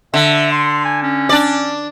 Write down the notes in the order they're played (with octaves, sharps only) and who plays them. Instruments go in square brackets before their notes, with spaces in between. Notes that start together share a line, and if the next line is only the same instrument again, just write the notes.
[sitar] D3 [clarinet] E5
[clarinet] C6
G#5
C#4
[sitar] D4 D5